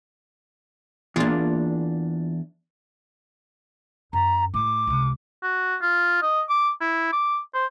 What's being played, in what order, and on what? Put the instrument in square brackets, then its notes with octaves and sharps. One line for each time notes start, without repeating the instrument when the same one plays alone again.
[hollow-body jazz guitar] E2 D4 [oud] A#3 F4
[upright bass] F#2 [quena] A#5
[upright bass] A2 A3 [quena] D6
[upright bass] C#2 C3
[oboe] F#4
F4
D#5
D6
E4
D6
C5